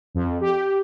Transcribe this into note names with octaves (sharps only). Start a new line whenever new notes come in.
F2
G4